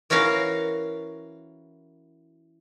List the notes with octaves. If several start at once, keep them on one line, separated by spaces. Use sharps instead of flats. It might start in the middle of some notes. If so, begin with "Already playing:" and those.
E3 C#4 F#4 A#4 F5